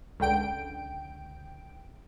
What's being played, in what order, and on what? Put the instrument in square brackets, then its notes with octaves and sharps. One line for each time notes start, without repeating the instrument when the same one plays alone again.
[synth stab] C#2 D3 G5 D7